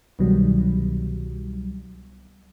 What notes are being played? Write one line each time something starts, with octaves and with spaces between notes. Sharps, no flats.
C2 B2 D#3 F#3 G3